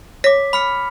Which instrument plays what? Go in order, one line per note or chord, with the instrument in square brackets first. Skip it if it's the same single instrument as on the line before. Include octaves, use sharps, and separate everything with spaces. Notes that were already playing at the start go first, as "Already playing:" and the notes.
[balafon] C#5 [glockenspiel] D6 B6
[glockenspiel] B5 F6 C#7